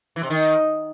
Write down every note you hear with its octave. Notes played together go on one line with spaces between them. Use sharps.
E3
C3
D#3